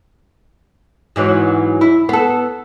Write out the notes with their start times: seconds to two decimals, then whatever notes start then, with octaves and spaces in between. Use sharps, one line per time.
1.16 G#2 E3 F#3
1.81 E4
2.09 B3 A4